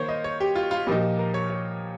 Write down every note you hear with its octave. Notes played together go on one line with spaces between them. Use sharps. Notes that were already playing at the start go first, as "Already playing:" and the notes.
Already playing: D#3 A#3 C5 C#5
D#5
C#5
G4
F4
F4
A#2 F3 A#3 D#4 G4
A#4
C#5
C#5